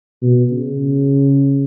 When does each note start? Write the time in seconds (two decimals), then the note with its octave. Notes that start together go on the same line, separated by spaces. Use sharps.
0.22 B2
0.51 C#3